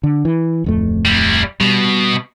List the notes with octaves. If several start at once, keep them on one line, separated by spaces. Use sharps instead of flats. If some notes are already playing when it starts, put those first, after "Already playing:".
D3
E3
D1 F2 A3
G3 E4
B2 G3